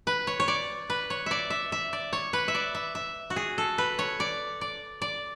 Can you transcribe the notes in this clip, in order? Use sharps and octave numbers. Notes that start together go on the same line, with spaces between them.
B4
C#5
C#5
D5
B4
C#5
D5 E5
E5
E5
D5
C#5
B4
E5
D5
E5
E5
F#4
G#4
A4
B4
C#5
D5
D5
D5